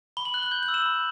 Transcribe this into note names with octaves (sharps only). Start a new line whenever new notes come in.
B5 G7
F#7
F#6 G7
F#7
G6 G7
F#7
E6
E7
B5